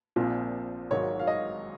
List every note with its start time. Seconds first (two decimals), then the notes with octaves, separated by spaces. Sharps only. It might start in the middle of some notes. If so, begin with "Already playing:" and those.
0.16 A#1 A#2 F3 C4 F4
0.90 G#1 G#2 D#3 F#3 C#5
1.19 F5
1.27 D#5